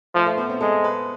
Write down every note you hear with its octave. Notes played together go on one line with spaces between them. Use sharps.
F3 A3
A3
B3
C4
G#3 A4
B4